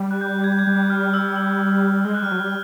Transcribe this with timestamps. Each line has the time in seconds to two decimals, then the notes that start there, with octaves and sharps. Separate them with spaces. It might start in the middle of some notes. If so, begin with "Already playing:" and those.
Already playing: G3
0.11 F#6
0.21 G6
0.44 G#6
0.52 G6
0.59 G#6
0.67 G3 G6
0.90 F6
1.03 F6
1.14 E6
1.36 E6
2.05 G#3 F6
2.14 F#6
2.22 G3 F6
2.32 F#3
2.40 G3